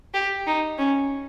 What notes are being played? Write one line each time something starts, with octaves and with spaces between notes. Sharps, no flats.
G4
D#4
C#4